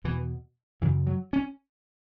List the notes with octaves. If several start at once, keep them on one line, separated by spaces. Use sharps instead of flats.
E2 B2 E3
F#2 C#3 E3
F#3
C#4